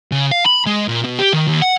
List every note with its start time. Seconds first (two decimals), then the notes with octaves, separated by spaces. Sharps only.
0.12 C#3
0.32 F5
0.46 B5
0.66 G#3
0.88 A#2
1.04 B2
1.19 G4
1.33 D#3
1.48 D#2
1.62 F#5